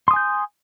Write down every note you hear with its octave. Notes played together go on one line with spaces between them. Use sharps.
G#5 C6 D#6 G6